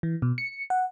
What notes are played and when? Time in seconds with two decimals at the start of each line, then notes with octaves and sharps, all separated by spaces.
0.03 E3
0.22 B2
0.38 C#7
0.70 F#5